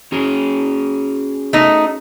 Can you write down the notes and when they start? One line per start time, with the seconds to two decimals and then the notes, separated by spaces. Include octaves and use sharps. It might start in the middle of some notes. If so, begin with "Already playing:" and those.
0.12 C#4 F#4 G#4
1.53 A3 D#4